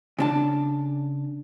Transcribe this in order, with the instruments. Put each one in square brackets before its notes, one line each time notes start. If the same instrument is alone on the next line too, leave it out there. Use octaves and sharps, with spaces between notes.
[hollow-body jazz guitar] C#3 D4 A5